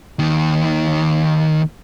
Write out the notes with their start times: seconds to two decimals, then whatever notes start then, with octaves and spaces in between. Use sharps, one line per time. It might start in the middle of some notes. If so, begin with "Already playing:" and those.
0.19 D#2 D#3